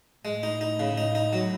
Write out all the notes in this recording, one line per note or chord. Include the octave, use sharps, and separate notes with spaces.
A2 G#3
D#4
D#4
C#3
D#4
D#4
F#3